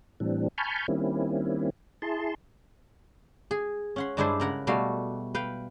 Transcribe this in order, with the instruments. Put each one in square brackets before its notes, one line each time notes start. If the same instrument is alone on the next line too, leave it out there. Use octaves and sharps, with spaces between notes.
[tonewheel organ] A2 E3 G3 C4 D4
G#5 A5 B5 C#6 F6 G6
D#3 G3 A#3 C4 C#4 E4
E4 G#4 A5 C6
[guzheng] G#4
C#4 F#5 C6
G2 G#3 D4 E4 B4 C5
C#3 A#4 F#5
B2 G3 A3 F#4 F5
B4 F5 G5